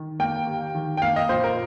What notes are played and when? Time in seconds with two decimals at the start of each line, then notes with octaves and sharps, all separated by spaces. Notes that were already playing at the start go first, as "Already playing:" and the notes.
Already playing: D#3
0.20 A#3 G5
0.46 D#2
0.75 D#3
0.97 G5
1.02 A#3 F5
1.16 D#5
1.29 A#2 C5
1.44 A#4